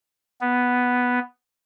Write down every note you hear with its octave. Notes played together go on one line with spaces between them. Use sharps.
B3